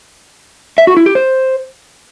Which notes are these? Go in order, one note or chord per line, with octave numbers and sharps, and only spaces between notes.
E5
F#4
E4
G4
C5